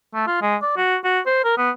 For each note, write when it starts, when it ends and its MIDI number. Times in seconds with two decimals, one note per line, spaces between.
0.14 0.25 57
0.27 0.38 65
0.42 0.56 56
0.62 0.73 74
0.77 0.97 66
1.04 1.20 66
1.26 1.43 72
1.44 1.57 70
1.58 1.71 59